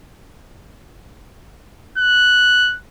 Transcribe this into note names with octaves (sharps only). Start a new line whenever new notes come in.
F#6